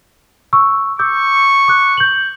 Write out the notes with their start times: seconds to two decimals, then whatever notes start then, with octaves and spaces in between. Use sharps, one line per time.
0.53 C#6 E6
0.99 C#6 D6 E6 G6
1.68 D6 F#6
1.97 G6 F#7